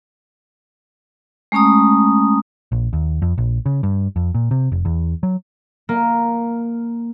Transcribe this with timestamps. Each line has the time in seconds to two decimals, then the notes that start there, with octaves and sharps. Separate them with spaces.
1.52 G#3 A3 C#4 A#5 D#6
2.72 A#1
2.93 D#2
3.22 F2
3.38 A#1
3.66 C#3
3.83 G2
4.16 F2
4.34 A#2
4.51 C3
4.72 F1
4.85 E2
5.23 F#3
5.89 A#3